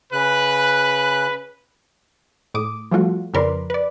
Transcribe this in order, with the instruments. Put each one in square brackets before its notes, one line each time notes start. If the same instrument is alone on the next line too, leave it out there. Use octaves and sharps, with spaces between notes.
[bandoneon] C#3 F#6 [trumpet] B4
[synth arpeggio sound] A2 D6 D#6
F3 G3 A3 F4 F#4
F2 C#3 A#4 B4 D5 C6
B4 D5